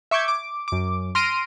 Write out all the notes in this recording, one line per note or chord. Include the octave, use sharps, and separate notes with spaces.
E5 C#6 D6 G6 G#6
D6
F#2 D6
C6 F6 A#6 D7 D#7